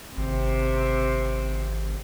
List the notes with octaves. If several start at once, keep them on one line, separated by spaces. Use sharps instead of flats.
G#1 C3 C4